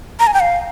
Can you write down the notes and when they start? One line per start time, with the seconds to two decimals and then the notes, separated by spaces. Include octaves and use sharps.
0.20 A#5
0.27 G#5
0.34 G5
0.40 F5